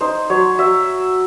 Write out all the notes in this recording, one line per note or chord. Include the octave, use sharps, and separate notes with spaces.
D#4 C5
F#3 C#5
F#3 E5